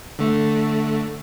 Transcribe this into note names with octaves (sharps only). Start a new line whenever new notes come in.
D3 A3